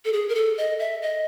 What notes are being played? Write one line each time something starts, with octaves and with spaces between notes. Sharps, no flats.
A4
G#4
A#4
A4
D#5
E5
D#5